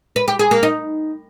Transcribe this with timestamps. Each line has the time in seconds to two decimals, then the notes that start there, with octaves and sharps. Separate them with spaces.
0.16 B4
0.28 G4
0.39 G#4
0.51 A#3
0.63 D#4